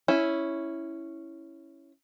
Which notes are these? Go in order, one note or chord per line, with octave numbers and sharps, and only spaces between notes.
C#4 E4